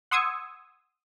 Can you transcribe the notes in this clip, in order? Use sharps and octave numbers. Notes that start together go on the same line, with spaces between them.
F#5 C6 D#6 E6 G#6 C#7